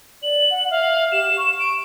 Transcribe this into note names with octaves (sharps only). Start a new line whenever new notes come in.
D5 F#7
F#5
E5 F5
G4 E7
C#6
D7